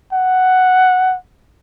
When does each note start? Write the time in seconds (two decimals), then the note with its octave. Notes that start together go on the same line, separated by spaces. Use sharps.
0.13 F#5